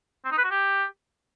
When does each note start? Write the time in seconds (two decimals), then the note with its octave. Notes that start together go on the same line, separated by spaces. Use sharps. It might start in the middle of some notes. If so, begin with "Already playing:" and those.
0.25 C4
0.31 D#4
0.38 B4
0.44 F#4
0.51 G4